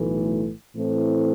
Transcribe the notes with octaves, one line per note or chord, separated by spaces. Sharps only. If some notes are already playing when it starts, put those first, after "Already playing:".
Already playing: B1 A2 E3 A3
A2 E3 A3 C4